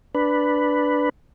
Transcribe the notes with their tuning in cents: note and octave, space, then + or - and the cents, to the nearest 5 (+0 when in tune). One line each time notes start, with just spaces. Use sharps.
D4 +0 B4 +0